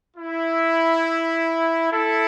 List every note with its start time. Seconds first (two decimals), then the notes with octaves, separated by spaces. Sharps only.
0.17 E4
1.91 E4 A4